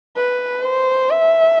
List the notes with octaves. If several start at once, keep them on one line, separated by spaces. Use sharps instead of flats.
B4
C5
E5